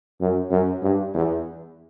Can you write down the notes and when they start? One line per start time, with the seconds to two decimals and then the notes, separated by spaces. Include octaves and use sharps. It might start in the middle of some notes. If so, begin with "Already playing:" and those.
0.21 F#2
0.51 F#2
0.82 G2
1.14 E2